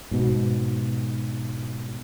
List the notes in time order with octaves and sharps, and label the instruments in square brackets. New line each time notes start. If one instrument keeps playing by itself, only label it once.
[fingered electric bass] G#2 B2